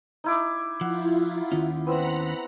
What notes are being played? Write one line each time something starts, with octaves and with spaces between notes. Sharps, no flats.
D#4 E4 D6
F3 E4 F4 F#5
D#2 D#3 C#4
B3 C4 E4 F#5 A#5 B5